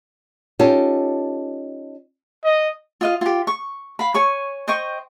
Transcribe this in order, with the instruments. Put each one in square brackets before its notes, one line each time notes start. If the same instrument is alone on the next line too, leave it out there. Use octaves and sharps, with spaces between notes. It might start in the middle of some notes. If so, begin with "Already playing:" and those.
[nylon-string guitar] C#4 D#4 F4 G4 A4
[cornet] D#5
[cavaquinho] F4 D#5 F5
F4 G4
C#6
F5 B5
C#5 G#5 C#6
C5 D#5 G5 C#6